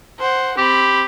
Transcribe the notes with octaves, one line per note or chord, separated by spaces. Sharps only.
C5 F#5
C4 G4 B5